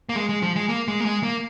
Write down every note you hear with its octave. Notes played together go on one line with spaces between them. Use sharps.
A#3
G#3
G#3
F3
G#3
A#3
G#3
A#3
G#3
A#3